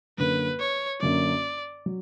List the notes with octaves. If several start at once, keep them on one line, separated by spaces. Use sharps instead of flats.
F#2 D3 A#3 C#4 B4
C#5
F#2 D3 A#3 C#4 D5
F#3